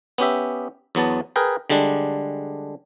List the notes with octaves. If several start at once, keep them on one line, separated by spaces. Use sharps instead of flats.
B3 C#4 G4 E5
E2 F#3 B3 A5
G#4 A#4 B4 G5
D3 G3 G#3 D4